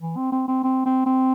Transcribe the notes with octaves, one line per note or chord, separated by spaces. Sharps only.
E3
C4
C4
C4
C4
C4
C4